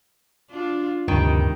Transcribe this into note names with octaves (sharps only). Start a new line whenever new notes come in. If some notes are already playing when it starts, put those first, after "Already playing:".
D4 F4
D2 G2 C3 D#3